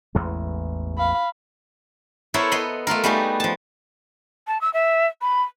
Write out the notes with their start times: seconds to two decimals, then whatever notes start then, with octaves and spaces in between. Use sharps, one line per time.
0.15 A1 E2 G#3
0.98 F5 B5
2.34 B3 E4 A4 A#4 C5 C#5
2.51 B3 D#5 B5 C6
2.87 A3 B3 F4 A#4
3.04 G3 A3 B3 D#4 F#4 G#4
3.40 F3 A5
4.47 A5
4.61 E6
4.74 E5
5.21 B5